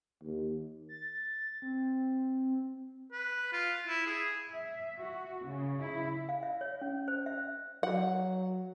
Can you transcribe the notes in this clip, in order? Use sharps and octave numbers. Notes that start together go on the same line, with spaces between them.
D#2
A6
C4
B4
F4
E4
G#4
E5
F#4
C#3
E4
F5
E5
C#5
C#4
C5
E5
F#3 F#5